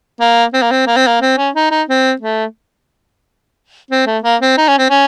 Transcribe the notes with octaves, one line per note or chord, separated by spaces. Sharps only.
A#3
C4
A#3
C4
A#3
C4
A#3
C4
C#4
D#4
D#4
C4
A3
C4
A3
A#3
C4
D#4
C#4
C4
C#4